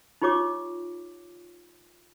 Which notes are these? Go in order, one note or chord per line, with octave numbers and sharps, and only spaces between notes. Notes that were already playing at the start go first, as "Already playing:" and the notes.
D#4 F4 G4 C#5 D6